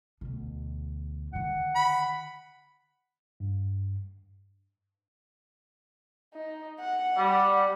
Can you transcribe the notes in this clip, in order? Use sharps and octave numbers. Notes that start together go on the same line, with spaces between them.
D2 B2
D3 D#3 F#5
B5
G2
D#4
F#5
G3